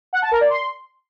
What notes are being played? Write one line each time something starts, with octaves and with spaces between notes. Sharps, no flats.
F#5
A5
A#4
D5
C6